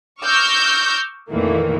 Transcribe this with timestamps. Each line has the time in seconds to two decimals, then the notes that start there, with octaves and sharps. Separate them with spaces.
0.22 C#6 D6 E6 F6 G6 A#6
1.31 F2 A#2 D#3 E3 A3 A#3